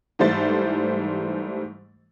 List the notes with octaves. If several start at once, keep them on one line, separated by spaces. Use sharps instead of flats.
G#2 E3 G3 A3 C5 A6